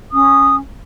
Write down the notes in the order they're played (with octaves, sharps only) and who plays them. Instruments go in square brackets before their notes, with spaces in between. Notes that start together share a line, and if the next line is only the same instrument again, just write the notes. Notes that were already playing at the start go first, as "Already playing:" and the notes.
[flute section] C#4 D#6